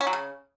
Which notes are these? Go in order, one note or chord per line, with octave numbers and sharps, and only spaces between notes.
C#4
F#3
C#3